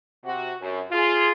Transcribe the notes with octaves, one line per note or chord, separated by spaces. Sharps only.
C3 F#4
F#2
F4 G#4